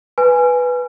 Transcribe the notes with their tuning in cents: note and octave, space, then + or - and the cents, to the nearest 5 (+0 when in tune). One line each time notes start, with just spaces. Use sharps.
B4 +0 G#5 +0